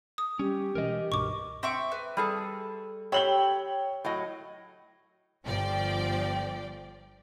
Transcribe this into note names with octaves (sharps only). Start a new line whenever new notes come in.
D#6
G3 C#4 G4
B2 E3 G#3 A#4 D#5
C#2 G2 B2 C#6 D6
C4 E5 C#6 D6
B4
G3 G#4 A4
G4 C#5 B5 E6 F#7 G7
A2 F#3 D#5
G1 F3 D5 G5